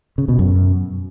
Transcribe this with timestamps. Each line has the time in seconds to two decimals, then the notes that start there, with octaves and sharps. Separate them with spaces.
0.18 C#3
0.28 B2
0.39 F#2